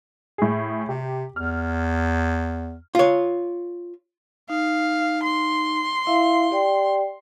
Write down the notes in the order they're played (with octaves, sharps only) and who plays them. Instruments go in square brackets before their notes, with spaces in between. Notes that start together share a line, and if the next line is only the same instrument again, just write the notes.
[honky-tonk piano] A2 G#4
[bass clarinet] C3 [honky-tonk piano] G4
[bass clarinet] E2 [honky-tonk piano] F6
[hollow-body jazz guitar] F4 C#5
[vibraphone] D#4 [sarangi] F5
[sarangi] C6
[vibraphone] E4 E5 F5
G4 D5 G5